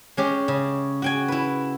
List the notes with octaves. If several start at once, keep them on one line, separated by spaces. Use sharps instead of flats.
G#3 C#4 G4
C#3
F#4 G5 G#5
E4 B4